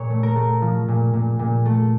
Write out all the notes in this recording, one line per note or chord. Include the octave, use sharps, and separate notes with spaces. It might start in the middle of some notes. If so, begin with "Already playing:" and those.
Already playing: A#2 C#5
A3
A#4
A3
F3
A#2
A#2
A#2
A3